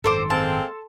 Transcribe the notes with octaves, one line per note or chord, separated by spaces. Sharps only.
G#1 F#2 D#3 C4 A4 C5 C6 D6
G#3 A#3 C4 A5